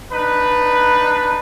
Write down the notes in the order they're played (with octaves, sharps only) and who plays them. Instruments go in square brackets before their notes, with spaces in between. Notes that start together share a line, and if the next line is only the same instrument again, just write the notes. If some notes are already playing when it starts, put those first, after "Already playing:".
[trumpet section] D4 D#4 B4